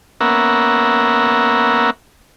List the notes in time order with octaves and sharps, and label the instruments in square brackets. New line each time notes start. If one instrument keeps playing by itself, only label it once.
[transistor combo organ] A#3 B3 C#4 A#4 E5 F#5